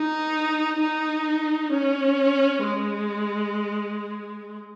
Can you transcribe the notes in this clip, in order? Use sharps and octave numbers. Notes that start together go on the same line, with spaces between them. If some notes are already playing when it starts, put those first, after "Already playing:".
Already playing: D#4
D#4
C#4
G#3